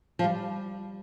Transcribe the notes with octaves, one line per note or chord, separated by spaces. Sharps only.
F3
G3